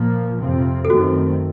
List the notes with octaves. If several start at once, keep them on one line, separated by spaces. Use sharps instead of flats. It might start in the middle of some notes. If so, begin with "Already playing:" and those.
Already playing: A#2 F3 A#3
F2 C3 F3 C4
A4
F#2 D#3 A3 C4 F#4